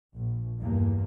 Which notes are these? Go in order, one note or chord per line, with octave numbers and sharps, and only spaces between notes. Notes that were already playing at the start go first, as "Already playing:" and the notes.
A#1
E2 G2 A#3